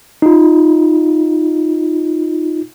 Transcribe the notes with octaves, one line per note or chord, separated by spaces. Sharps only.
D#4 F4